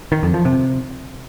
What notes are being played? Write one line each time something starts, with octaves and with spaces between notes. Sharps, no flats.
D#3
F2
F3
C3